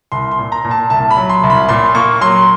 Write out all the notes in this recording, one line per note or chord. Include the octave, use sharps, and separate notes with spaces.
C2 C6
C6
A#2
A#5
A#2
A5
C2 A5
B5
F#3
C6
C2
B5
A#2 C6
A#3 C#6
F#3 C6